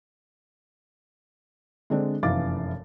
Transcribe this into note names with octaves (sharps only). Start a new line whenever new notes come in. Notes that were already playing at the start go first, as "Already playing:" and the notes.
D3 G#3 C4 D4
F1 F#2 E3 F5 D6 A6